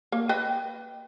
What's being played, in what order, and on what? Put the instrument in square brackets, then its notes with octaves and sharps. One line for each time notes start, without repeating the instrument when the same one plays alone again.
[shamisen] A#3
B4 D#5 G5